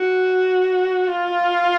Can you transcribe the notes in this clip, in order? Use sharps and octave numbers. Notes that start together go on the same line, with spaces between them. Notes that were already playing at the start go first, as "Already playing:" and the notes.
Already playing: F#4
F4